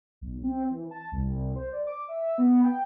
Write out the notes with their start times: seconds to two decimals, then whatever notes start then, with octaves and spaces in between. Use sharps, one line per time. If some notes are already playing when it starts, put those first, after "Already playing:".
0.21 B1
0.43 C4
0.70 E3
0.91 A5
1.12 C2
1.37 C2
1.55 C5
1.72 D5
1.87 D6
2.08 E5
2.38 B3
2.63 G5